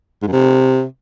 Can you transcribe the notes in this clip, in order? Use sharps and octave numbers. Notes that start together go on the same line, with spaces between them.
G#2
F#2
C3